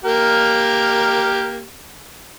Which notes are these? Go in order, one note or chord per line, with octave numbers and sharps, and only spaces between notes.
A#3 G4 A#4